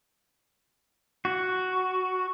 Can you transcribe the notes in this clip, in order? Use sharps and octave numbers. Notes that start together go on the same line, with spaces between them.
F#4